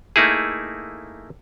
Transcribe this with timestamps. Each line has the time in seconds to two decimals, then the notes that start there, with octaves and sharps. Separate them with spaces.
0.16 A3 A#3 D#4 E4 G#4